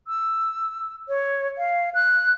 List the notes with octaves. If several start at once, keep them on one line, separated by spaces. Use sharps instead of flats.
E6
C#5
F5
F#6